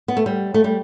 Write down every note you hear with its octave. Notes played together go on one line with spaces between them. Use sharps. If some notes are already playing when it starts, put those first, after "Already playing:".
B3
A3
G3
A3
G3